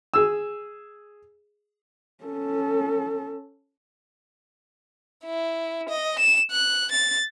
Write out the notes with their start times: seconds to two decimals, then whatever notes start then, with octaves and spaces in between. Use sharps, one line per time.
0.14 G#4 E6
2.24 C#4 A4
5.25 E4
5.89 D#5
6.19 E7
6.51 F#6
6.92 A6